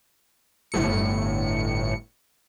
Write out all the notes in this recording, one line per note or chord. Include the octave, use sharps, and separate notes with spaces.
G1 A2 C#7